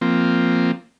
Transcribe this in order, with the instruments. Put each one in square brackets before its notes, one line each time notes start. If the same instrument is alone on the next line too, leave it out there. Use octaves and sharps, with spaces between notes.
[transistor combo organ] F3 A#3 C4